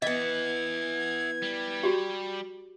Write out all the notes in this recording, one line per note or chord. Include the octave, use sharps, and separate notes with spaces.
E3 B3 D#5 E5 F#5 G#6
G3
F#4 G4